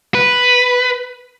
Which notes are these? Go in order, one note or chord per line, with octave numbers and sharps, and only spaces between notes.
B4